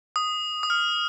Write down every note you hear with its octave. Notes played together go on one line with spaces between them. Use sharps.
D#6
D#6
F6